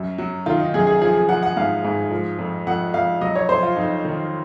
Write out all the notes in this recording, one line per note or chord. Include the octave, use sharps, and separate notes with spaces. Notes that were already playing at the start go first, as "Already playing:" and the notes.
Already playing: F#2
F#3
D#3 F4
D#4
F#2 G#4
G#4
F3 G#4
G#4
F3 F#5
F#5
G#2 F5
G#2
F3
F2
F2 F#5
F2 F5
F#3 D#5
C#5
F2 C5
F4
F2 D#4
D#3